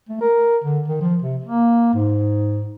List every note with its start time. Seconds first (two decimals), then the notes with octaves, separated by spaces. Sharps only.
0.09 A3
0.21 A#4
0.64 D3
0.88 D#3
1.01 F3
1.22 C3
1.44 A#3
1.94 G#2